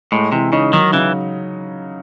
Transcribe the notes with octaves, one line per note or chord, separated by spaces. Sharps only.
A2 G#3
C3 E3
C#3 D#4
D#3 F#3
C#3 E3